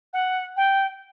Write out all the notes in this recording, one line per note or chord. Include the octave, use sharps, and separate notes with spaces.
F#5
G5